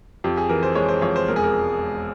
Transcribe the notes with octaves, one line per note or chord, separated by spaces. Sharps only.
F2 G4
G#4
E3 A#4
C5
G#3 C#5
C5
F2 C#5
C5
E1 A#4
G#4
A#4